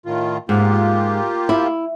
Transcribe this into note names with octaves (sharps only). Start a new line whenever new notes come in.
A2 D#3 F4
G#2 A#3 F4 G4
E4